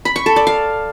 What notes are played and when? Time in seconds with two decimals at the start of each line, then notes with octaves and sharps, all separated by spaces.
0.05 B5
0.16 C#6
0.26 A4
0.36 D5
0.47 F5